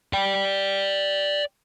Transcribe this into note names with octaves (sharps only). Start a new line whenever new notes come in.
D5 G5